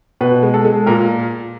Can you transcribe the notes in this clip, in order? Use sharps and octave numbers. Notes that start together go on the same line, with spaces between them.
B2 B4
G#3
A4
G#3
A#2 A#4